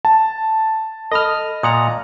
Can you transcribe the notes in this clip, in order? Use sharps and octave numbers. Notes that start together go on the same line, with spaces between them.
A5
A4 D#5 B5 D#6 F6
A#2 F#5 A#5 D#6